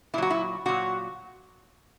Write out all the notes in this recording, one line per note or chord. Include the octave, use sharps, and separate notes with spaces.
A#2 F#3 E4 F#4
E4
A#2 F#3 F#4